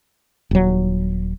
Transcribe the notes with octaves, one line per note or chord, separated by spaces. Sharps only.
D#1 F#3